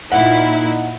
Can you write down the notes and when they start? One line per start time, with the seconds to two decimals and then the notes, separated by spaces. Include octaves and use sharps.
0.12 A#2 D#4 E4 F#5